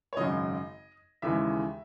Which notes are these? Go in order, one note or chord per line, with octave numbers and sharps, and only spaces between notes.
C#5
G#1 F#2 C#3 D#5
D#2 C#3 E3 G#3 E5